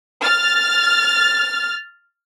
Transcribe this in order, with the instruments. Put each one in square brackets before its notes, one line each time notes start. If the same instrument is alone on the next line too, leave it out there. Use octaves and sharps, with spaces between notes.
[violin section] F6 A6